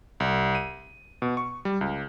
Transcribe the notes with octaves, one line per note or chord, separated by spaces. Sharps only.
C2
D#7
B2
C#6
G3
C#2